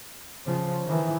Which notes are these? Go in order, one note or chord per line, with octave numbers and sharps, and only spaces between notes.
C#3 F3
D#3 E3